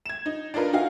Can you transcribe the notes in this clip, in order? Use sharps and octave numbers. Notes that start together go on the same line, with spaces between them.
G#6 E7
D#4
D4 D#4 F4 A#4 B4
D#4 F#4 F5 G#5